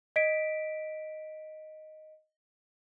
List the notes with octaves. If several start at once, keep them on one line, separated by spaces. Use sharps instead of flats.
D#5 B6 D7